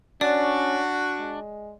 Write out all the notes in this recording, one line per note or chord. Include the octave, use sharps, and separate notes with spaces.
C#4 D4 F#4 D5
G#3